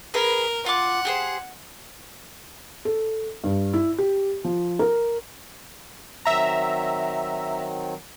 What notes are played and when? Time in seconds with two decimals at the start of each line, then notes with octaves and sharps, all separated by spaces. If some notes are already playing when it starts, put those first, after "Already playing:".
0.14 G#4 A#4 B4
0.66 F4 F#5 D6
1.05 G4 G#4 C5
2.85 A4
3.44 G2
3.73 E4
3.98 G4
4.44 F3
4.79 A#4
6.25 D#3 F#3 C4 E5 A#5